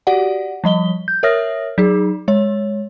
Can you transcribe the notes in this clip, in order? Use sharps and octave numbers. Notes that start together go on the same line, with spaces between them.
F#4 G4 D5 F#5
F3 G3 D#5 G7
G6
A#4 C#5 E5 D#6 F6 A#6
F#3 D#4 G#4
G#3 C#5